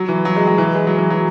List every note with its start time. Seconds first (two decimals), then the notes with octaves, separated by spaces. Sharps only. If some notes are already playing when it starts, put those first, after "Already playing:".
Already playing: F#3
0.08 E3
0.25 F#3
0.36 G#3
0.47 F#3
0.58 E3
0.75 G#3
0.87 F#3
0.98 E3
1.10 F#3